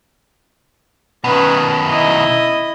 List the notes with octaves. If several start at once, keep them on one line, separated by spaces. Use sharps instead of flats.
B2 D#3 C#4 B4
E4 D#5